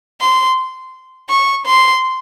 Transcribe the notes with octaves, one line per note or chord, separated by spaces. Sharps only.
C6
C#6
C6